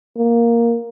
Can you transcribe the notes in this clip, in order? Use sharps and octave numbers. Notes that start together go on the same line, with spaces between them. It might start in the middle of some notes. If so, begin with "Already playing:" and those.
A#3